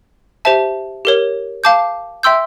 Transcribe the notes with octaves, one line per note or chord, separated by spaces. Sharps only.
G4 C5 E5 A5
G4 A#4 C#5
F5 A5 D6 G6
E5 G5 C6 E6 G6